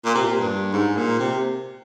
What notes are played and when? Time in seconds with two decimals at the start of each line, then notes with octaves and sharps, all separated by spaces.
0.05 A#2
0.15 C3
0.25 A#2
0.39 G2
0.73 G#2
0.97 A#2
1.19 C3